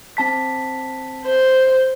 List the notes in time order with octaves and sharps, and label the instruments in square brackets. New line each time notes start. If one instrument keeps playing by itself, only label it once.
[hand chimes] C4 A5 B6
[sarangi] C5